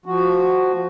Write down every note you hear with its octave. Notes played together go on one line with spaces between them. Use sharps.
F3 F#4